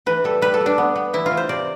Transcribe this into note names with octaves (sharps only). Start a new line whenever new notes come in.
E3 B4
G3 A4
G3 B4
A4
G3
D4
B3
B3
E3 E4
F4
E3
C5
C3 D5